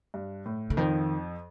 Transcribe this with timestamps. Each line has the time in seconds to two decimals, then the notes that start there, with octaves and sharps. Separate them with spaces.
0.14 G2
0.46 A2
0.70 D3
0.77 F2 D#3 F3